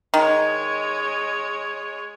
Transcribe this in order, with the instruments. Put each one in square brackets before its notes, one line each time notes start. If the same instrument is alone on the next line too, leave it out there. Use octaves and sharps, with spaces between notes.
[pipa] D#3 [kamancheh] G#3 C#5